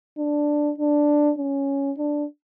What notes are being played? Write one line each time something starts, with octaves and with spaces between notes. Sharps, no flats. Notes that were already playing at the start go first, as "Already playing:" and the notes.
D4
D4
C#4
D4